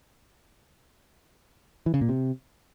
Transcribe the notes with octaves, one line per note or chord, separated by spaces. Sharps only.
E3
C#3
A#2
C3